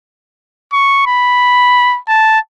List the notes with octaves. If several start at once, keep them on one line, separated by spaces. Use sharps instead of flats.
C#6
B5
A5